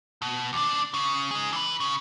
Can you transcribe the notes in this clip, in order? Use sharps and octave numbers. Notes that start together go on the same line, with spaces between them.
B2
D#2 D4
C#3
D#4 G#4
E3 B4
C#3